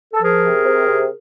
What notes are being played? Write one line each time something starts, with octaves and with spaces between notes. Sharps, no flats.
A4
F3 G#4 A#4
C3
C3
C3